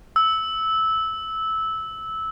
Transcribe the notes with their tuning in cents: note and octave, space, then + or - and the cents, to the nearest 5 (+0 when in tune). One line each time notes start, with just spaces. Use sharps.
E6 -15